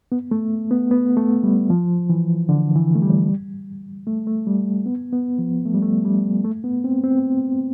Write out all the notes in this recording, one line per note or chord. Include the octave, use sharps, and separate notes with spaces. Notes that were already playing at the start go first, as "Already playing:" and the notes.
B3
A3
B3
B3
A3
G3
F3
E3
D3
E3
A3
G3
A3
A3
G3
B3
B3
F3
A3
G3
A3
G3
A3
B3
C4
C4